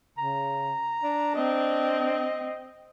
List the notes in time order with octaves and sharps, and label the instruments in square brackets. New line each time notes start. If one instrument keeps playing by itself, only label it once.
[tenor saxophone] C#3 [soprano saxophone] A#5
[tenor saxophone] D4
[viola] C4 [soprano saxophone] D#5